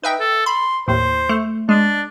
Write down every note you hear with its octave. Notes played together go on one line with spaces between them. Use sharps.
D#4 B4 E5 G5
A4
B5 C6
D#2 A2 C5
A3
G#3 D4